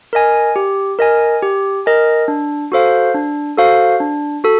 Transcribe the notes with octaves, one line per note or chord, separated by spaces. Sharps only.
A#4 D#5 G#5
G4
A#4 D#5 G#5
G4
A#4 D#5 G#5
D4
F#4 A4 C5 F5
D4
F#4 A4 C5 F5
D4
F#4 A4